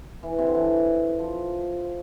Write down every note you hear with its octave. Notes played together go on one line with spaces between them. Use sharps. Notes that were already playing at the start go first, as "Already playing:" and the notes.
E3
C3
D3
E3
F3
F3